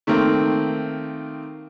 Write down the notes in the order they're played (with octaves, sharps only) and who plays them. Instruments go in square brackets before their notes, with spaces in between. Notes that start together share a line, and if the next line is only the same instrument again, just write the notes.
[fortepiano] D#3 A3 A#3 C4 A#4